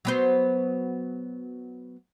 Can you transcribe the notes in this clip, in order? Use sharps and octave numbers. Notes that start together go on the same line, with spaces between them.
F#3 B3 C5